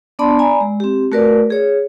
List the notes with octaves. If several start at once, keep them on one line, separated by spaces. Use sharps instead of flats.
B3 D4 D5 A5 B5 C6
D5 G#5 A#5 B5
G#3
C4 G4
A3 F#4 A#4 B4 D5
G#4 C#5